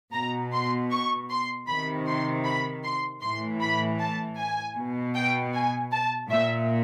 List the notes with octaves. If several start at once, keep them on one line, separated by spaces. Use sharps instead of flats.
B2 A#5
C6
C#6
C6
C3 D#3 B5
C6
B5
C6
A2 E3 C6
B5
A5
G#5
B2
G5
G#5
A5
A#2 E5